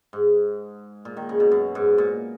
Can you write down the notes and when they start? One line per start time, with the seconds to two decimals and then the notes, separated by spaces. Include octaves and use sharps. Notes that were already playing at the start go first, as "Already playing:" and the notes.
0.13 G#2
1.05 A#2
1.17 D#3
1.29 C#3
1.40 B2
1.51 F#2
1.75 G#2
1.98 A#2